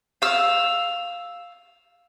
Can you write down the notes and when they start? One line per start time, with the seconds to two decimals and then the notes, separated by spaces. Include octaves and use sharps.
0.22 F5 E6